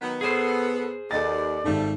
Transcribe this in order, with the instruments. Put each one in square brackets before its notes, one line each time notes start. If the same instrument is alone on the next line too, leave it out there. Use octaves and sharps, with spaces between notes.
[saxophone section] D#3 F#3 B3
[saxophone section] B3 [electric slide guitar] G#4 C5 [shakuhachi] A4
[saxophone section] D#2 [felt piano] A4 D#5 A6 [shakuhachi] D5
[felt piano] G#1 G#2 [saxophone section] G3 A3